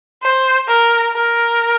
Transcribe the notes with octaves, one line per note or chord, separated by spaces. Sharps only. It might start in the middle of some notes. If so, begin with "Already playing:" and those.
C5
A#4
A#4